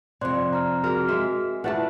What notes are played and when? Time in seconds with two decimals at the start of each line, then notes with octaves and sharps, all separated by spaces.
0.21 F2 C3 D5 C6 F#6
0.53 A#5 F6
0.84 F#4 G#4 A#4 F6
1.08 G#3 E5
1.64 A3 D4 E4 F4 B4 F#5 A5